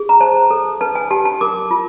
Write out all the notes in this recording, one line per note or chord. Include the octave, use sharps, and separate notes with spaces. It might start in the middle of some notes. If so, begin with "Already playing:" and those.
Already playing: G#4
A#5
C5 A5
A4
B4 A5
G#5
G4 A5
A5
A#4 D6
F4